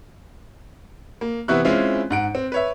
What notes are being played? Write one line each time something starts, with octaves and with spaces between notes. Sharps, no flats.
A#3
C3 E3 B3 E4 C#6 F#6
G#3 C4 C#4 E4 F4
G#2 F#5 D7
C4
B4 C#5 E5